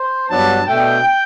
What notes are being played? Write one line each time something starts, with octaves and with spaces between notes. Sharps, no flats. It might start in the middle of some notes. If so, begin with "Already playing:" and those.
Already playing: C5
G2 F#3 B3 D4 A5
B2 A3 D4 G5